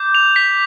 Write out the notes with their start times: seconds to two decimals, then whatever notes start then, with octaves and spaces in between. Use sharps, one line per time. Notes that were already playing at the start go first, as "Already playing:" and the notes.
Already playing: D6 G6
0.15 F7
0.36 B6